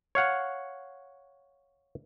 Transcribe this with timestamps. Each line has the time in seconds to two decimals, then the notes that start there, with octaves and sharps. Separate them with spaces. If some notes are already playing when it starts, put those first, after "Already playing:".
0.15 C#5 F5 F#5